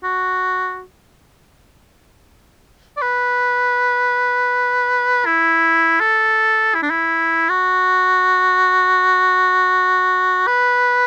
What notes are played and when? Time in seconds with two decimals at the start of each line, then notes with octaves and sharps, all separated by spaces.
0.04 F#4
2.97 D5
3.02 B4
5.25 E4
6.00 A4
6.75 E4
6.82 D4
6.90 E4
7.49 F#4
10.47 B4